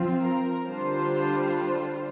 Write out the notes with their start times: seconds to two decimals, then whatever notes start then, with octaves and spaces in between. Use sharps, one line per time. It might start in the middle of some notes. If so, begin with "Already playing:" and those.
Already playing: F3 C4 F4
0.22 A#4
0.67 D3 G3 D4 F4 C5